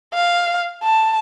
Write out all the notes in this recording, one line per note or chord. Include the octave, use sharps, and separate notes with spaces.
F5
A5